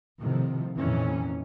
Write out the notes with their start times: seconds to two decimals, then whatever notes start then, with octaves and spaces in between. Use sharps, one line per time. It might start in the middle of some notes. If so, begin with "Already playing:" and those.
0.21 A2 C3 D#3 F3
0.78 F2 A#2 D#3 E3 C#4